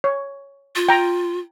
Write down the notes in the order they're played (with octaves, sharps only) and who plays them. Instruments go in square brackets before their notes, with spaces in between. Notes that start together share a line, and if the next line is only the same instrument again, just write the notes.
[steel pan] C#5
[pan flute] F4
[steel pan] G5 A#5